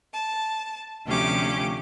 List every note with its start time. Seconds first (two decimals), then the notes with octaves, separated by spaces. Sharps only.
0.13 A5
1.06 D2 C3 F3 C#4 G4 D6